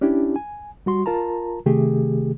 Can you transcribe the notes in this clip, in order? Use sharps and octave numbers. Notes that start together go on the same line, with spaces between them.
C#4 D4 E4 G4
G#5
G3 F#4 C6
F4 A#4 A5 A#5
C3 D#3 A3 G4 G#4